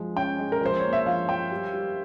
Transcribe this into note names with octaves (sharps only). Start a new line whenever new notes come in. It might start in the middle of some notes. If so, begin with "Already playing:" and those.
Already playing: F3 G#3
C#4 G5
G#3
A#4
F3 C5
A#3 C#5
E5
F3 F5
F3 G5
G3
G3